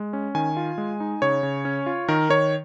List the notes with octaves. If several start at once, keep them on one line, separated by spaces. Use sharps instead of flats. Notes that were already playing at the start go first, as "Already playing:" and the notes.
Already playing: G#3
C#4
D#3 G#5
F4
G#3
D#4
C#3 C#5
C#3
C#4
F4
D#3 A#4
D#3 C#5